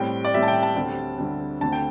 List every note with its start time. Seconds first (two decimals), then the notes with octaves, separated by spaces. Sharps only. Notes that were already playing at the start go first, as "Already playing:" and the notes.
Already playing: A2 G3 C4 G5
0.25 D5
0.34 A2 G3 C4 E5
0.43 A5
0.48 G5
0.63 A5
0.76 D2 D3 G3 C4
1.18 D2 D3 G3 C4
1.61 D2 D3 A3 C4 A5
1.72 G5